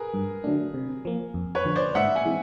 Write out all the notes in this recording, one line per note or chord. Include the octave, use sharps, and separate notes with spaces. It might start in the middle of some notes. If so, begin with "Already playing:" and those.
Already playing: G#4 A#4 B4
G2
D3 F#3 A3 D4
C3
F3 A#3
F2
B4 C#5
D3 F3
C5 D5
G#2 E5 F#5
F#5 G#5
E3 G#3 C4